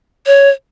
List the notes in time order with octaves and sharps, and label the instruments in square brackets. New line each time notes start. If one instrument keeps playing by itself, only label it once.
[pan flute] C#5